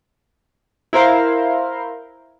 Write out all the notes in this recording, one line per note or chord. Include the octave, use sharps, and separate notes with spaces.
E4 A#4 C5 F5